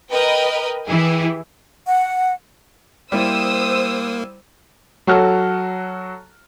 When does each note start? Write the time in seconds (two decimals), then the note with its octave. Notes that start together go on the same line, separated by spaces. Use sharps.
0.11 A#4 B4 D#5 G5
0.87 E3 E4 G4 G#4
1.87 F#5
3.12 G3 A#3 E4 C5 D#6 E6
5.07 F#3 F#4 A4 F6